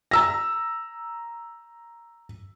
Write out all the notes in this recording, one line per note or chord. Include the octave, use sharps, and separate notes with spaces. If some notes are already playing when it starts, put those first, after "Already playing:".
A#5 E6 A#6